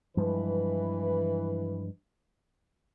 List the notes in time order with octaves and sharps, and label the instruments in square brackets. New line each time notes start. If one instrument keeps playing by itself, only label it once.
[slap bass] G2 F3 G#3 [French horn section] E3 B4